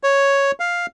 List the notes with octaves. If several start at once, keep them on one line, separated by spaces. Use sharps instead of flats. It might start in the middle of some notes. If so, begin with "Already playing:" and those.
C#5
F5